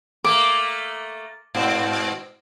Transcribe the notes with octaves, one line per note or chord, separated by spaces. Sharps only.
A3 A#3 D6
G#2 B2 C4